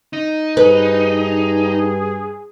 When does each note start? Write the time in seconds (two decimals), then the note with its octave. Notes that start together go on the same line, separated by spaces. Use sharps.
0.13 D#4
0.57 G2 G#4 B4